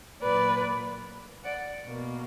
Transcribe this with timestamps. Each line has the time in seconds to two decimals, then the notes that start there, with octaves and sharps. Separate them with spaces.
0.21 A#2 F#3 A#3 B4 D5
1.44 D5 F#5
1.86 B2 A#3